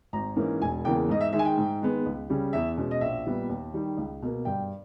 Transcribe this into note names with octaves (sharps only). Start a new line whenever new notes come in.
G#1 A#5
G#2 E3 A#3 C#4
E1 G#5
E2 C#3 E3 A#3 G5
G#2 D#5
E5
D#3 G#3 E5
G#5
G5
G#2
D#3 G#3 B3
C#2
C#3 G3 C#4
E2 E5
B2 G#3 C#4
D#5
A#1 E5
A#2 G3 B3
D#2
D#3 G3
C#2
B2 A#3
G2 G5